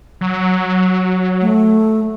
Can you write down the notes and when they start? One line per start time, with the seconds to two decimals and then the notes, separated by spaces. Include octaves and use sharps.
0.21 F#3
1.41 A3